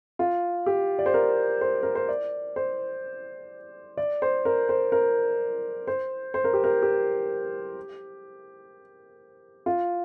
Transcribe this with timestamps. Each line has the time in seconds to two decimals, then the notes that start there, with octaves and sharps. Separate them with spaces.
0.19 F4
0.66 G4
0.99 D5
1.06 C5
1.14 A#4
1.61 C5
1.83 A#4
1.95 C5
2.09 D5
2.56 C5
3.97 D5
4.22 C5
4.45 A#4
4.69 C5
4.92 A#4
5.87 C5
6.34 C5
6.44 A#4
6.54 G4
6.64 A#4
6.82 G4
9.66 F4